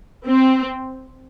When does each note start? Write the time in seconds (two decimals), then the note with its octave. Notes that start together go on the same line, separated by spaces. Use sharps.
0.26 C4